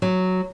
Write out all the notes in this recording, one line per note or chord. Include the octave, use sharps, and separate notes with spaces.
F#3